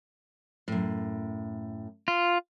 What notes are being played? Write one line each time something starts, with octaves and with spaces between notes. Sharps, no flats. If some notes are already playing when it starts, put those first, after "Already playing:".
F#2 A2
F4